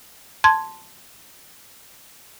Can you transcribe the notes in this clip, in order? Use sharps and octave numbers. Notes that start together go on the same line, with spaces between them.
A5 C6 G#6